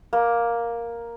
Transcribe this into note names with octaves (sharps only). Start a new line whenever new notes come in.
A#3